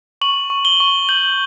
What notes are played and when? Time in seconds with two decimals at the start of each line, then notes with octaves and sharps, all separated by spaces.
0.21 C#6 F#7
0.50 C#6
0.65 G7
0.80 C#6
1.09 G6 F#7